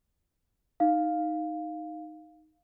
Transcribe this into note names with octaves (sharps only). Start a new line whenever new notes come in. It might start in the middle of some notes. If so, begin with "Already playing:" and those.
D#4 F5